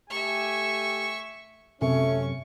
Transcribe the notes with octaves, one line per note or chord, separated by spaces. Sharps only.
A3 G4 E5 G#5 C#6
F#2 C3 A3 C#4 C#6